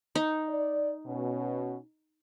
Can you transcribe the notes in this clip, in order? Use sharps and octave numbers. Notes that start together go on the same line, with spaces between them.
D#4
D5
B2 C#4